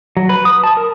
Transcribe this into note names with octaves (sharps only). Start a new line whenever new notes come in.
F#3
B4
D#6
A5
A#4